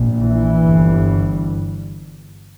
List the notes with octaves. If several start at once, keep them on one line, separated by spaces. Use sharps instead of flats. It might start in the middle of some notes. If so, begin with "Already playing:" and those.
Already playing: A#1 A#2
E3
G1 G2